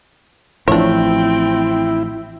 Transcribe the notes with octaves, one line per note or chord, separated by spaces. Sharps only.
A1 F3 C4 D4 E4 C#5 G5